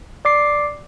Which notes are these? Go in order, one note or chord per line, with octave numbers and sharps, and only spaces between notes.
D5 D6 C7